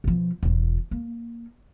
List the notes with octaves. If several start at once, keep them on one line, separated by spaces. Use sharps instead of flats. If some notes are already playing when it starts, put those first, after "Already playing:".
B2 F3
E1 F4
A#3